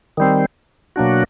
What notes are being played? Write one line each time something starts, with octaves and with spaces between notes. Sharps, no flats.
D#3 G3 C4
B2 F#3 A#3 D4 F#4